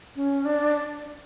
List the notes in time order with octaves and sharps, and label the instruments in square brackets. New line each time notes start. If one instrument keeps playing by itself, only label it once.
[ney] C#4
D4